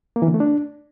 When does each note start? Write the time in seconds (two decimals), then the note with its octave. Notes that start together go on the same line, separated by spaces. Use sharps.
0.16 A#3
0.22 E3
0.28 D3
0.34 A3
0.40 D4